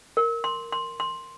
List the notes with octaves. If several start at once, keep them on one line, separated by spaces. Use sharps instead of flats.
A#4
C6
C6
C6